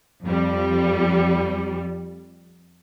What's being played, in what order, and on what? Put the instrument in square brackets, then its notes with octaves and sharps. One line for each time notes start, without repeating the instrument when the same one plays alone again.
[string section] F2 G3